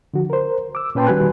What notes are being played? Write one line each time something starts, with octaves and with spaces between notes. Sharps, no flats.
D3 F3 F#4
A#4 C5
D6 E6
A#2 C#4 B4 G5 A5 C6
D#3 G3 F#4 B4 G#5 F#6